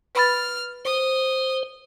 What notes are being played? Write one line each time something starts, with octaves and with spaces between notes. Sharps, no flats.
B4 B5 F6 A6
C5 D#6